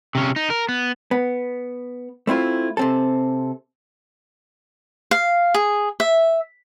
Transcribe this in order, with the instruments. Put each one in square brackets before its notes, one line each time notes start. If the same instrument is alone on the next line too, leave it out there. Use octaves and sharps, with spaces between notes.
[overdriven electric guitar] C3 C#4
D#4
A#4
B3
[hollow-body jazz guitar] B3
A3 C4 E4 F4
C3 C4 A4
[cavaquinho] F5
G#4
E5